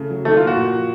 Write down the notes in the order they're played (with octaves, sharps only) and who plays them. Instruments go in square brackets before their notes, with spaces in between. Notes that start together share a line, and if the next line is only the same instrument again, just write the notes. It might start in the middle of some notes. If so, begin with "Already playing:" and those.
Already playing: [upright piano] C#3 A3
F#3
[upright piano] D#3 [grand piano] A3
[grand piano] F4
[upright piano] A#3
[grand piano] F#4
[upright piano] A#2
F3